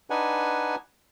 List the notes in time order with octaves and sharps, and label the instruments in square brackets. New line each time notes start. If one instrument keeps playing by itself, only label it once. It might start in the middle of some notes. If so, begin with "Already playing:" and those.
[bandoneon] D4 D#4 B4 F#5 G#5